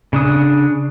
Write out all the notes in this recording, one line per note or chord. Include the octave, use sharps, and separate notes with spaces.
C#3 D4 D#6